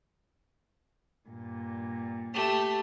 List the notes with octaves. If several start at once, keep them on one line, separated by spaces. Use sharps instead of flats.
G2 A#2
A3 G4 A5